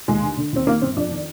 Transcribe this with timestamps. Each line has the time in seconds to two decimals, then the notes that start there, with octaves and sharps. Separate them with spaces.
0.08 D#2 G#3
0.22 D3
0.37 D3
0.53 D#2 C4
0.67 D#3 A#3
0.82 G1 C4
0.96 F2 D4
1.11 D#3